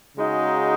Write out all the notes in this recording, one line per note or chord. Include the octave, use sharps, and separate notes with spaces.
C#3 G#3 D#4 F#4